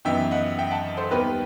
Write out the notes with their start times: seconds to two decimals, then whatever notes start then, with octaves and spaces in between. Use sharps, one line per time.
0.05 F#2 E3 B3 D#4 E5 G5
0.31 D#5 F#5
0.58 E5 G5
0.71 F#5 A5
0.97 A4 C5
1.11 D#2 D#3 G3 B3 G4 B4